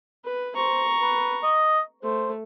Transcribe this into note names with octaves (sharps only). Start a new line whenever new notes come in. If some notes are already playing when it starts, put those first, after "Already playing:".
B4
C5 A#5 C#6
B4
D#5
A3 C5